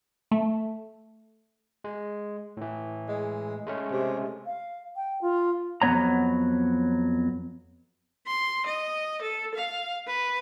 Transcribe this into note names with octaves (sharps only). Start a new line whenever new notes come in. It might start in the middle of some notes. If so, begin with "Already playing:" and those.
A3
G#3
A2 E3
G#3
G#3 A3 C#4
C3
F5
G5
F4
F2 F#3 B3 C#5 A#5
C6
D#5
A4
F5
B4